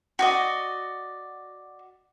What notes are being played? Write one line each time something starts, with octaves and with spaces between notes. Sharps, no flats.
F#4 D5 D#5